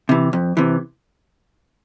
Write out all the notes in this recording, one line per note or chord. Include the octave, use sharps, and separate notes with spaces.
C3 E3
F2
C3 E3